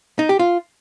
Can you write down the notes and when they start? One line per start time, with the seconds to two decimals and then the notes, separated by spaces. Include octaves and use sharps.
0.19 D#4
0.29 G4
0.39 F4